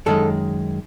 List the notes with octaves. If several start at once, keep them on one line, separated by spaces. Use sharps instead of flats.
F#2 D#3 G#3 A4